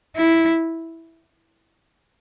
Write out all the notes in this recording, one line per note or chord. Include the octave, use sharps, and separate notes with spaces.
E4